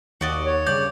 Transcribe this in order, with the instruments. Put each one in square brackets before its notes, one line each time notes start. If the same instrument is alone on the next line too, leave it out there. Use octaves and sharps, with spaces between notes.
[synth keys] D#2 [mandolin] F#4 D5 D#5
[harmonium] C#5
[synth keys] G2 C#3 [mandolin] D5 [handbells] G6